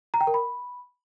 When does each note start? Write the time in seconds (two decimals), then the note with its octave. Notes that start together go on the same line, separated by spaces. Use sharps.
0.14 A#5
0.20 G5
0.27 A#4
0.34 B5